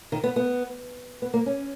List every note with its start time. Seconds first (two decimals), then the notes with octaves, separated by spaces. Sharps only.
0.12 D#3
0.24 B3
0.36 B3
1.22 B3
1.34 A#3
1.46 C#4